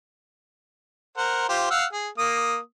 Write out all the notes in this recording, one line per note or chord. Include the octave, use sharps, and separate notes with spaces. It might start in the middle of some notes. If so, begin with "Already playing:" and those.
A#4 C5 F#5
F4 G4 C5
F5 F#5 E6
G#4
A#3 D#6